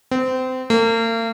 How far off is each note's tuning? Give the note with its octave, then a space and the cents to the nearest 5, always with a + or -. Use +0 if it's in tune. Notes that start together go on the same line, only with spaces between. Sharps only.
C4 -25
A#3 -40